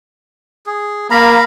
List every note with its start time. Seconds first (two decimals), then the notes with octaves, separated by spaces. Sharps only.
0.66 G#4
1.11 A#3 F5 A#5 B5